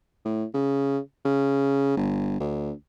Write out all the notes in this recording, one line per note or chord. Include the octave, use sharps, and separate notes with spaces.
A2
C#3
C#3
G1
D2